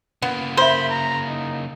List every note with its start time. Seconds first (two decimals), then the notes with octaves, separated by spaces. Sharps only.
0.22 C#3 A#3 B3
0.57 A#4 C5 E5 B5
0.90 A#5
1.28 D#4